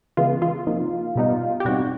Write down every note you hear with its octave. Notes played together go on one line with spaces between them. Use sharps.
C#3 E3 G#3 B3 F4
F4
C3 F3 A#3 D#4
B2 G3 B3 D#4
G4
B2 G3 C4 D#4 F#4